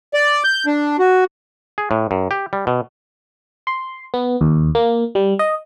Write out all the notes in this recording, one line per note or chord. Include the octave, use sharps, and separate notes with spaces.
D5
G6
D4
F#4
G#4
A2
F#2
G4
G3
B2
C6
B3
D#2
A#3
G3
D#5